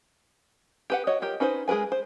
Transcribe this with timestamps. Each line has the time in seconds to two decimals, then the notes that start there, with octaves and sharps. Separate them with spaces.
0.90 G4 B4 F#5
1.07 F#4 C#5 D#5
1.22 F4 G4 A#4
1.40 C#4 D#4 B4 C5
1.68 G#3 G#4 A#4 B4 G#5
1.92 C5